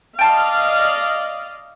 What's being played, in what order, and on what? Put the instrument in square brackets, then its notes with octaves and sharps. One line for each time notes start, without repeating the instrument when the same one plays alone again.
[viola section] D5 D#5 F5 [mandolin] G5 A5 C6